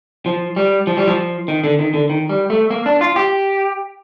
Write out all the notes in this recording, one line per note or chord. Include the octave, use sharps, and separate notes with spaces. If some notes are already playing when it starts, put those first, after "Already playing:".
F3
G3
F3
G3
F3
D#3
D3
D#3
D3
D#3
G3
A3
A#3
D4
F4
G4